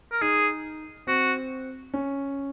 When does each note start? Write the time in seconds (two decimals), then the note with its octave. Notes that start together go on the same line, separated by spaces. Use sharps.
0.11 A#4
0.21 D#4 G#4
1.07 C4 F#4
1.94 C#4